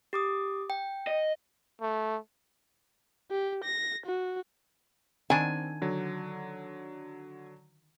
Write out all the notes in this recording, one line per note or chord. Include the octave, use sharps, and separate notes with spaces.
G4 D6 D#6
G5
D#5
A3
G4
A#6
F#4
D#3 C4 D4 G#5
D3 F#3